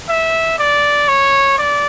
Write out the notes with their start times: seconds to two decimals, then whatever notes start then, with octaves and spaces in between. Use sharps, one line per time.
0.09 E5
0.59 D5
1.08 C#5
1.58 D5